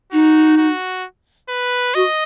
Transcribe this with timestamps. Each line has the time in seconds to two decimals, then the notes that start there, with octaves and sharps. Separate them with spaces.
0.12 D#4 F#4
0.57 F#4
1.49 B4
1.95 F#4 D#5